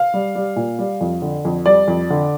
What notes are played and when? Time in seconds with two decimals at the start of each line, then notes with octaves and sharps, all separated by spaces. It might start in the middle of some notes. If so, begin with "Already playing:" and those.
Already playing: F5
0.14 G3
0.35 G3
0.56 A#2
0.79 G3
1.01 F2
1.22 D3
1.45 F2
1.66 G3 D5
1.88 F2
2.10 D3